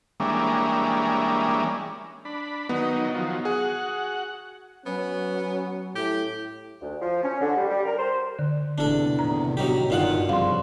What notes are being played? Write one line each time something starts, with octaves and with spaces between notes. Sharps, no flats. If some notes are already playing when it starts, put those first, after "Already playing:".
E3 G3 G#3 A#3 C#4 D4
D4 B5
D#3 F#3 B3 D#4
D#3 F3 F#3
F#4 G#4 F#5
F#3 B3 C#4
A2 G4
D2
F3
C#4
D3
G3
G3
A#4
C5
D3
E2 A2 C3 D4 A4
A2 C3 D#3 A#5
G1 F#3 D#4 G4
G2 A#2 D3 D#3 C#4 F4 F#5
C2 F#2 C#3 F3 F5 C6